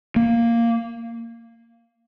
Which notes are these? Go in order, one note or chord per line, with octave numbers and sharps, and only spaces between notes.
A#3